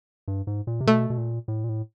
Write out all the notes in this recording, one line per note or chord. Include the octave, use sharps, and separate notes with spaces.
G2
G#2
A#2
C3
B2 A3
B2
A#2
A2
A#2
A2